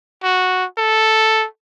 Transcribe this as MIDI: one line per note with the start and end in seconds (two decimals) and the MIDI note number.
0.23 0.65 66
0.78 1.46 69